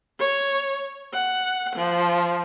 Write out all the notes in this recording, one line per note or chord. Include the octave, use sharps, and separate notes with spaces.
C#5
F#5
F3